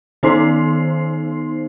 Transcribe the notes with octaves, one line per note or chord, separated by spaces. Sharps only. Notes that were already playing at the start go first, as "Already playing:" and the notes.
D#3 B3 D#4 C5 C6 C7